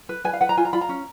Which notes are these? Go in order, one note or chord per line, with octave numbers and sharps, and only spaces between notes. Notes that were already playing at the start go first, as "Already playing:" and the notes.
B4
B4 G#5
F5
B4 F#5
A#5
F4 G#5
A#5
F4 B5
A#5
C#4